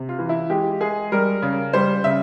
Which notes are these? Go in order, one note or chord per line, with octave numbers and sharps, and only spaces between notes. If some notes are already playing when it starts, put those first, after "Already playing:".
Already playing: C3
F4
E3
E4
G#3 G4
G#3 G#4
G3 A#4
C#3
G3 C5
C#3 E5